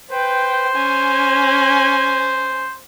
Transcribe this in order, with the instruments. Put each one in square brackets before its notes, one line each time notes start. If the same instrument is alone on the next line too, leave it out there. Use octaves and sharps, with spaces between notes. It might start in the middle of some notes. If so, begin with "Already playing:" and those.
[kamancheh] B4 G5 [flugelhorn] C5
[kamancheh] C#4 G#5